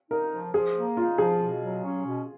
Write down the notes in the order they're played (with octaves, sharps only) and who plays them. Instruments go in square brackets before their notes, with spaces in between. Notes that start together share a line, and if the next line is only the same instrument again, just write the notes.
[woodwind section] D#4 [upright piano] A#4
[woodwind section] F3
[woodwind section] F3 [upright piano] G#4
[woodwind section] A#3
[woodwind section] D#4 [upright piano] F4
[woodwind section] F3 [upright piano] G#4
[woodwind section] B2
F#3
C#4
B2